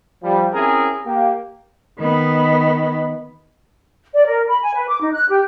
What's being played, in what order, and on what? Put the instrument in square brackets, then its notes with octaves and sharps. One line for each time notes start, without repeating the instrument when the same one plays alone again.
[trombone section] F3 G3
C4 C#4 E4 G#4 A#4
A#3 G4
[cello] D#3 B3
[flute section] D5
A#4
B5
G#5
B4
D6
D#4
F#6
G4